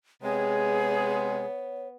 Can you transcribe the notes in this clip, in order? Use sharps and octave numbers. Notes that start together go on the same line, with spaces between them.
C3 G#3 B3 G#4 C#5